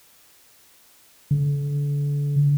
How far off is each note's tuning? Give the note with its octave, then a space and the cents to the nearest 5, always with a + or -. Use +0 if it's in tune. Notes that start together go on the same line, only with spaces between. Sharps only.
D3 -35